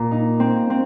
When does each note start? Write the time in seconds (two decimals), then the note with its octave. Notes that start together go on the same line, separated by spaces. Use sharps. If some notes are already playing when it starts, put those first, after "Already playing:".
Already playing: A#2
0.11 D#4
0.40 C4
0.70 C4